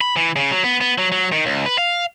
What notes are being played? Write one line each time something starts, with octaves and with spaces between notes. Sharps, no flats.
B5
E3
C#3
F#3
B3
B3
F#3
F#3
D#3
C#2
B4
F5